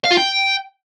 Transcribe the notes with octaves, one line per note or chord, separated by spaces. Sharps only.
F5
F4
G5